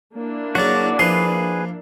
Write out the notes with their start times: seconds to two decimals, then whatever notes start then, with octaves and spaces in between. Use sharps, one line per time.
0.15 A#3 D4 E4
0.55 C#3 F#3 F#4 D5
0.99 F3 G#4 B4 C6